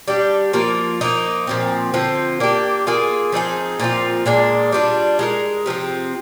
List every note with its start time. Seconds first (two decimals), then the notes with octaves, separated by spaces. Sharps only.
0.08 G3 D4 G4
0.53 F3 A#3 F4 A#4
1.01 F3 A#3 D#4
1.47 A#2 F3 C4
1.94 D3 F3 C4
2.40 A#3 D4 G4
2.87 A#3 F4 G#4
3.32 F3 C4 D#4 G#4
3.80 A#2 F3 C4 F4
4.26 A#2 G#3 D4
4.72 G3 D4 F4
5.19 G#3 D#4 A#4
5.66 C3 F3 C4